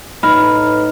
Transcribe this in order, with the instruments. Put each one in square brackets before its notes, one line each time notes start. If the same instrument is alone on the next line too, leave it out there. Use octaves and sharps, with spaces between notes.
[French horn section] A2 B4 [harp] D#4 [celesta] B5 F6